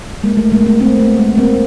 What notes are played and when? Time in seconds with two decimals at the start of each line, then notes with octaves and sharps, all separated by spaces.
0.24 G#3 A#3
0.37 A3
0.52 G#3 A#3
0.66 A3 B3
0.80 A#3 C4
1.00 A3 B3
1.18 G#3 A#3
1.38 A#3 C4